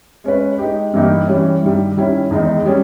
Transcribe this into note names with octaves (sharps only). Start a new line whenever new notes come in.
G#3 C#4 G#4 B4
G#3 D#4 G4
G2 E3 A#3 D#4 G4
E3 G3 C#4
G2 D#3 G3
D#3 G3 C#4 E4
E2 D#3 G#3 D#4
G3 C#4 G#4